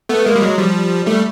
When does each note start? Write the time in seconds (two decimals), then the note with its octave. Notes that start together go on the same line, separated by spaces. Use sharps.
0.09 A3 B3
0.25 G#3 A#3
0.36 G3
0.42 F#3 G#3
0.58 F3 G3
1.07 G3 A3